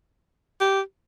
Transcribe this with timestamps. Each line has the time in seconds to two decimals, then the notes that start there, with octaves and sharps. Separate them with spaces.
0.61 G4